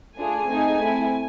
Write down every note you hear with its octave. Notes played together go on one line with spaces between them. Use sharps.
A3 D4 F4 G#4 G#5
A3 C4 D#4 G#4
A3 C4 E4